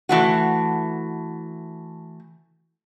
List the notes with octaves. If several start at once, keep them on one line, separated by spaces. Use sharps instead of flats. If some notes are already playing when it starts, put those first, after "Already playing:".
E3 A3 F#4